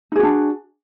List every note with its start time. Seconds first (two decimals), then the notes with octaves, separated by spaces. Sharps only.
0.12 D#4
0.16 G#4
0.19 F#4
0.23 D4